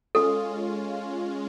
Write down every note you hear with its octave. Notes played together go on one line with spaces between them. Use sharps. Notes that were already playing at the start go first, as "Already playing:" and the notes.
G#3 C#4 F4 A4